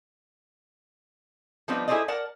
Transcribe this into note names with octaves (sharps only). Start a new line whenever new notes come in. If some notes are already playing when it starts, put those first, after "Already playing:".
F3 G3 B3 C4 D4 D#4
E4 G#4 A4 C5 D5 D#5
A#4 D5 F#5 A5